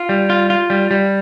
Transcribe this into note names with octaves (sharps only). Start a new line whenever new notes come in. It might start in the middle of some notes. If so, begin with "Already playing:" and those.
Already playing: F4
G3
F4
F4
G3
G3